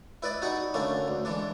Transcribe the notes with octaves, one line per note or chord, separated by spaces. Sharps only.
E4 B4 D5 D#5
D#4 F#4 G#4 D#5 F#5
D3 A3 A#3 C#4 D4
D2
E3 G#3 D4